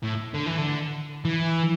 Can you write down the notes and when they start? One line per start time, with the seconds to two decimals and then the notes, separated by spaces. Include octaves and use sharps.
0.03 A2
0.34 D3
0.46 E3
0.58 D3
1.25 E3